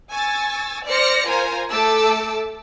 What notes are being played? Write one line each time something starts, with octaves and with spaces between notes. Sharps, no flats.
G#5 C#6 E6 A6
C5 D5 F6 A#6 C#7
F4 A#4 C5 G#5 A#5
A3 A4 A5 D6 E6